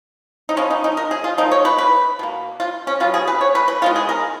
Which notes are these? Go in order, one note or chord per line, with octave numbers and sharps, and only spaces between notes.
D#4
F3 B3 C#4
D#4
D#4
A#4
G#4
F4
F3 A#3 D#4
C#5
B4
B4
B2 A#3
F4
C#4
B2 F#3 B3 F4
G#4
B4
C#5
B4
B4
D#3 G#3 B3 F4
G#4
A#4